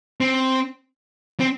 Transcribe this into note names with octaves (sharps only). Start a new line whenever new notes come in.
C4
C4